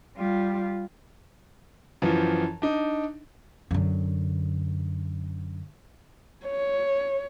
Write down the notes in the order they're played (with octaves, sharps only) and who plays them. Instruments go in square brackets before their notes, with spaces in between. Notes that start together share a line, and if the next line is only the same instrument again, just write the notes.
[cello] G3 F4
[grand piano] F#2 E3 F3
D4 D#4
[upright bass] F#2 D3
[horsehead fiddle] C#5